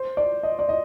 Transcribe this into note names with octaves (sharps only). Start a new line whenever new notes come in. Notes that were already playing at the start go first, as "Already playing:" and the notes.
Already playing: C5
D5
D#5
D5
D#5